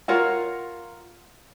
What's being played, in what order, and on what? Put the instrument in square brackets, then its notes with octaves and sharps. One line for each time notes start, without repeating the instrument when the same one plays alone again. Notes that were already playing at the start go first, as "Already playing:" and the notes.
[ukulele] F4 A#4 C#5 F#5